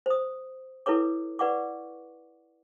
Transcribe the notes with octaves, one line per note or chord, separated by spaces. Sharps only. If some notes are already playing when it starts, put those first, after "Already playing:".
C5 D#6
E4 A4 B4 C#5 D6
B4 D5 F#5 C#6 D6